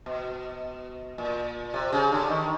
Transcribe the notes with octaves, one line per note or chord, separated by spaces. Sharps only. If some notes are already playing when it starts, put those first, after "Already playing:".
B2
A#2
C3
C#3
D3
D#3